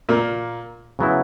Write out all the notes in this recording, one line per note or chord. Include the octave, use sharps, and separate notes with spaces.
A#2 A#3
C#3 F#3 B3 E4